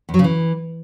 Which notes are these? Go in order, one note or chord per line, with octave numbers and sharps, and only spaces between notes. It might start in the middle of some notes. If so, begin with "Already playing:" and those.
E2
F#3
C#3
E3